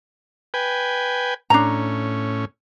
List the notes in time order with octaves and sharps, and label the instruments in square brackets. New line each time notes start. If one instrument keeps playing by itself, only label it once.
[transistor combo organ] B4 G5 G#5
[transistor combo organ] A2 C#4 [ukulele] D4 A#5